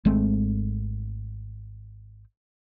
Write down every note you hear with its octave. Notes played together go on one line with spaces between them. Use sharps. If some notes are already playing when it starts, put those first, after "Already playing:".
G#1 G#3 A3 C4